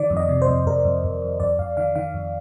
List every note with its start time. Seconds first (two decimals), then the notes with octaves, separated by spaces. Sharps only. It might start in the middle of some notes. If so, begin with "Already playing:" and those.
Already playing: D#3 D5
0.10 F2
0.17 D#5
0.29 C3
0.42 C5
0.47 F2
0.66 F2 A#4
0.85 F2
1.04 F2
1.22 F2
1.40 F2 D5
1.59 F2 F5
1.77 D#3 F5
1.95 D#3 F5
2.14 F2